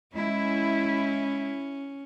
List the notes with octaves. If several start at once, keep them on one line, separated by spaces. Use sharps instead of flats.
G#3 C#4 E4